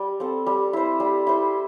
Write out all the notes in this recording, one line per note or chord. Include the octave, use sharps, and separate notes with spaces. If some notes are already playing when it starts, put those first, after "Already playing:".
Already playing: G3
C4 A4
G3
E4 C5
G3
E4 C5